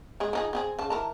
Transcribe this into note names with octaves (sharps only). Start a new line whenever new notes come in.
G#3 G#4
F3 D#4 G#4
C4 G4 G#4
C#3 A5
E3 A#4 A5